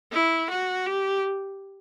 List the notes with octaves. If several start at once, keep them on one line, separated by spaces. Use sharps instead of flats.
E4
F#4
G4